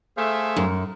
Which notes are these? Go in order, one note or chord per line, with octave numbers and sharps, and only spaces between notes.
A3 G#4 C5 E5 F5
F#2